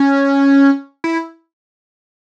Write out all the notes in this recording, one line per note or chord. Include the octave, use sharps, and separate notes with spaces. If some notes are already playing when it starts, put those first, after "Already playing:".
Already playing: C#4
E4